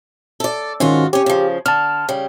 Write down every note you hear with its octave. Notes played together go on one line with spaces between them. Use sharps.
A4 D5
G#2 D#3 C#4 F4 F#4
C#4 G4 C#5
C#3 F3
D3 A5 F6
C#3 G3